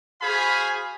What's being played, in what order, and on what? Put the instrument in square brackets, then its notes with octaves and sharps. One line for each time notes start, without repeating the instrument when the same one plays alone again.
[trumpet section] F#4 G#4 C5 F5 G#5 B5